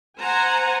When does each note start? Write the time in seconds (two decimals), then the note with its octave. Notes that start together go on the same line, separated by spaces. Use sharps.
0.20 C5 F#5 G#5 A#5